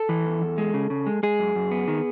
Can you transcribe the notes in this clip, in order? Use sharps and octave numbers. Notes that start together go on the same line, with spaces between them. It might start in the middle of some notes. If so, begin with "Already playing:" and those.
Already playing: A4
E3
E2
E2
G#3
C#3
C#3
G#3
G#3 G#4
F#2
F#2
B3
D#3